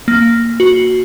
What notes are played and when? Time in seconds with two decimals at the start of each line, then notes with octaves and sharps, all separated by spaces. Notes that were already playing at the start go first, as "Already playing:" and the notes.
0.08 A#3
0.60 F#4